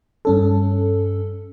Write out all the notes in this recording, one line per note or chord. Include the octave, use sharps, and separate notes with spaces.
G2 C#4 A4